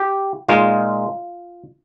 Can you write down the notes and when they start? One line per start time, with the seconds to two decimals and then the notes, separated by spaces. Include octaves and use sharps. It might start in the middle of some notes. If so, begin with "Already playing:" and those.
Already playing: G4
0.48 A#2 G#3 D#4 F4